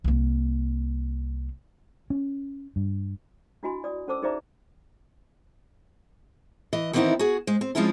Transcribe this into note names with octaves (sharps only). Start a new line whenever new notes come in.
C2 A#3
C#4
G2
D4 E4 F#4 D#5 G#5 B5
D5 D#6
C#4 A4 C5 A5 D6 E6
D#4 G#4 C5 D5 E5 A#5
E3 D#5
D#3 E3 B3 C4 D#4 E4
F#4 G#4
G#3 C5
C4
F3 G#3 C4 C#4 E4 F4